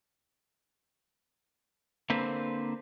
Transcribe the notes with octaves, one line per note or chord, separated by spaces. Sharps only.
D3 A#3 C4 B4 C5